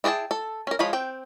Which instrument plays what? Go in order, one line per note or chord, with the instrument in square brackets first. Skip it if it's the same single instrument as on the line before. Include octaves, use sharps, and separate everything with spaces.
[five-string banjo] E4 G#4 D5 G5 A5
A4
C#4 A#4
F3 G#3 F4 C#5 B5
C4 G5